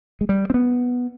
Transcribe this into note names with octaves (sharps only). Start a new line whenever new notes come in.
G#3
G3
C4
B3